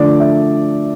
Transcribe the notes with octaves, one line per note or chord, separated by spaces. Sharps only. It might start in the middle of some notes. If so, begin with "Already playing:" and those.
Already playing: D3 F3 A3 D4 D5
E5